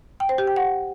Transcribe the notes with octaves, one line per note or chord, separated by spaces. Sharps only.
G5
C5
G4
G5
F#5